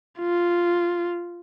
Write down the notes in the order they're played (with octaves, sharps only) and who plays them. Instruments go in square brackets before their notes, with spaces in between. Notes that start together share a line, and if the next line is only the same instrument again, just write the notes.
[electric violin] F4